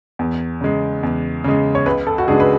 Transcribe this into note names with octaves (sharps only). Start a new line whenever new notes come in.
E2
C#3 G#3
E2
C#3 G#3
C#5
C#2 B4
A4
F#4
C#3 G#3 D4 G#4
B4